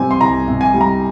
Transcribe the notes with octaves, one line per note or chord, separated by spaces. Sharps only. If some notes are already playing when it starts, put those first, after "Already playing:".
Already playing: C3 G3 C4 G#5
C6
C2 A#5
C3
G#5
G3
A#5